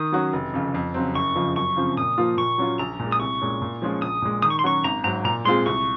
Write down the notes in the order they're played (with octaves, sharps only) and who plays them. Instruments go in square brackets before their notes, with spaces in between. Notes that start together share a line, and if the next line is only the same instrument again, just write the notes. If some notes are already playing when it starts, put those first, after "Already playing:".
Already playing: [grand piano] D#3 [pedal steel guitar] D#6
[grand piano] F#3 C#4 F#4
F1
F2 C#3
F2
C#3 F#3 C4
[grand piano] F#1 [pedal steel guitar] C#6
[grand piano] F2 C#3 F3
[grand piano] F#2 [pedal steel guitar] C#6
[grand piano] C#3 F3 C4
[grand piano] A#2 [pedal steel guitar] D#6
[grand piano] F3 A#3 F4
[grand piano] A#2 [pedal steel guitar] C#6
[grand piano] F#3 C#4 F4
[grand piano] A#1 [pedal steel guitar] A#5
[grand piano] A#2 G#3
[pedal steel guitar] D#6
[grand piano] C2 [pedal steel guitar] C#6
[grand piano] A#2 G#3 C#4
A#2
F3 G#3 C#4 F4
[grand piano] A#1 [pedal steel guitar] D#6
[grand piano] A#2 G#3
[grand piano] D#3 [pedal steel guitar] D#6
[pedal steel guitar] C#6
C6
[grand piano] F#3 C#4 F#4 [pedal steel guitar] C#6
[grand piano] G#1 [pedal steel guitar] A#5
[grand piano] G#2 F#3 [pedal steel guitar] A#5
[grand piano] A#2 [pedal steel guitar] A#5
[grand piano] G#3 C4 F4 G#4 [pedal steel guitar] C6
[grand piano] C2 [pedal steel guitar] C#6